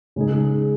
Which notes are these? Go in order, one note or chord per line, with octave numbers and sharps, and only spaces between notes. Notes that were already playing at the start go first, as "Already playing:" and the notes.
C#3 G#3 D#4 G#4